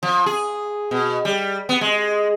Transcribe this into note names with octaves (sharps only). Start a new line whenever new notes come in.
F3
G#4
B2
G3
B3
G#3